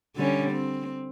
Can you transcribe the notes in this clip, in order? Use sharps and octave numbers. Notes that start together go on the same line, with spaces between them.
D3 G3 C#4
C4